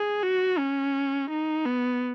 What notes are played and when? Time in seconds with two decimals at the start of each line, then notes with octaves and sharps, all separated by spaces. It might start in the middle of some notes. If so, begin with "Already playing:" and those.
Already playing: G#4
0.23 F#4
0.58 C#4
1.30 D#4
1.66 B3